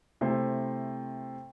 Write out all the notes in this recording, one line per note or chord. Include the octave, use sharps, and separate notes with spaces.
C3 A3 E4 C5